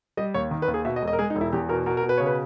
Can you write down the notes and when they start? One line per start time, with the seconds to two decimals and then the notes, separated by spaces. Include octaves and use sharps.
0.17 G3 D#5
0.34 D#2 C#5
0.51 D#3
0.62 B4
0.68 D#2
0.74 G#4
0.85 B2 E5
0.96 D#5
1.02 E1
1.08 D#5
1.13 A#4
1.19 G#3 G#4
1.30 D#4
1.35 E1
1.41 E4
1.53 E2 G4
1.69 B2 A#4
1.86 B2 A#4
1.97 A#4
2.03 B2
2.09 B4
2.18 C#3 C#5
2.26 B4